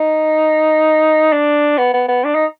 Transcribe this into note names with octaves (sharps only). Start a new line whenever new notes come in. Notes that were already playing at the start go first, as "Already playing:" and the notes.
Already playing: D#4
D4
B3
B3
B3
D4
D#4